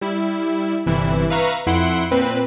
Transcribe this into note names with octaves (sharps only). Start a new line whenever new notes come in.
G3 E4
G1 C3 E3 G3 E4
B4 E5 F5 A#5 C#6
F2 E4 F#5 C6 D7
A#2 C4 B4